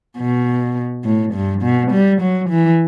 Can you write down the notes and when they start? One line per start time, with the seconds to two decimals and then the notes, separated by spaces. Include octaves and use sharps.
0.18 B2
1.05 A2
1.34 G2
1.63 B2
1.92 G3
2.21 F#3
2.50 E3